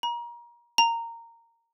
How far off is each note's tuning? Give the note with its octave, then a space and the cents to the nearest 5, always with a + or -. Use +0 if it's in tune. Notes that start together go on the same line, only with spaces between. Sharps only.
A#5 +30
A#5 -15